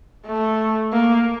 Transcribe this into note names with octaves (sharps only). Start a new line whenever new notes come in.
A3
A#3